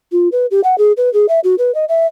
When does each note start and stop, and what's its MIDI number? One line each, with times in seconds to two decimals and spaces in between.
0.12 0.29 65
0.32 0.46 71
0.51 0.61 67
0.64 0.78 78
0.78 0.92 68
0.97 1.12 71
1.13 1.26 68
1.29 1.40 76
1.44 1.55 66
1.58 1.74 71
1.75 1.85 75
1.89 2.06 76